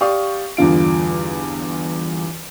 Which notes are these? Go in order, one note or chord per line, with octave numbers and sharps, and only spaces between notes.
G4 D5 F5 C#6 D#6
E2 G2 D3 F4 D7